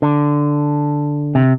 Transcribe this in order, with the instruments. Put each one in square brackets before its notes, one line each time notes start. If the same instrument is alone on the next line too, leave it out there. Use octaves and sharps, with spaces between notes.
[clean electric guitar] D3
C3